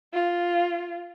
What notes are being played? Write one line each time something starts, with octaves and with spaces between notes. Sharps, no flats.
F4